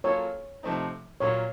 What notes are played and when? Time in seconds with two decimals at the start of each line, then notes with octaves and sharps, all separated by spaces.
0.04 F#3 A#3 F4 A4 C#5
0.63 C3 F3 A3 C4 D#4
1.20 A#2 F#3 A#3 F4 C#5